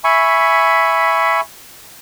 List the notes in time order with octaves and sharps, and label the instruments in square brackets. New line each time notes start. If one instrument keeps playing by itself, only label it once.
[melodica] E5 G#5 B5 C#6